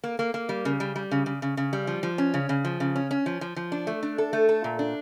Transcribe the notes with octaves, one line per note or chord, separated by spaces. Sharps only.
A#3
A#3
A#3
G3
C#3
G3
G3
C#3
C#3
C#3
C#3
G3
F3
F3
C#4
C#3
C#3
F3
C#3
C#4
C#4
F3
F3
F3
D4
A3
D4
A4
A3
A4
A#2
D4